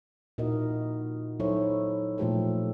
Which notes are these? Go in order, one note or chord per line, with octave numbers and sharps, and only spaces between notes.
A#2 D#4 E4 F#4 A#4 D#5
F#3 D#4 E4 A4 C5 C#5
A#2 F3 A3 G4 A4 C5